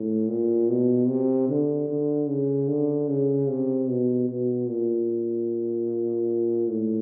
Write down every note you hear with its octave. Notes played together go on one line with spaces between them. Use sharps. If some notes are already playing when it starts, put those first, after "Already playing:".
Already playing: A2
A#2
B2
C3
D3
D3
C#3
D3
C#3
C3
B2
B2
A#2
A2